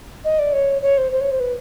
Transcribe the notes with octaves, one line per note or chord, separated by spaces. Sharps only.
D#5
D5
C#5
C#5
C5
C5
C#5
C5
B4